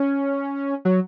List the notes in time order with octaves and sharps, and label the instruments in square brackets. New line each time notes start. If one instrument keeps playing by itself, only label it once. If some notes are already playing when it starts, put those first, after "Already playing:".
Already playing: [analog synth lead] C#4
F#3